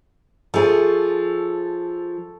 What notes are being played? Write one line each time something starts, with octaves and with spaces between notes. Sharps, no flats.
F3 G#4 A4 C#6